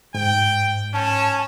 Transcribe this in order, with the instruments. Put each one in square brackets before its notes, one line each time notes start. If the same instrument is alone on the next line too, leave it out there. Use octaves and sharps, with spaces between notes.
[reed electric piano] G#2 [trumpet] G5
[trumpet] C#4 [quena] A5